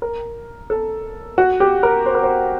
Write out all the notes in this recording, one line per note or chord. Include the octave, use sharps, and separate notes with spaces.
A#4
A4
F#4
G4
A#4
C5
A#4
C5